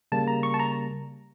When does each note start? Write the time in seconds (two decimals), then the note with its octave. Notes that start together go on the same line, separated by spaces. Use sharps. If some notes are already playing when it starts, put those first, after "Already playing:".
0.12 C#3 G3 A#3 A5
0.28 A#5
0.43 C#6
0.54 A5
0.59 A#5